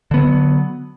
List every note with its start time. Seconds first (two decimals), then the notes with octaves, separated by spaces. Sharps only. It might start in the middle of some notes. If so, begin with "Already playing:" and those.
0.11 D3
0.14 B3
0.17 F#3